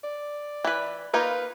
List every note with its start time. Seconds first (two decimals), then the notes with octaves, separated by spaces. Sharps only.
0.04 D5
0.64 E3 B4
1.14 A#3 D#4 F4 B4